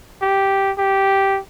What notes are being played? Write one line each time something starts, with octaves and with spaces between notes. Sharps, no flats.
G4
G4